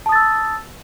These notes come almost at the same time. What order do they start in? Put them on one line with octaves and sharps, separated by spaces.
A5 D#6 A6 E6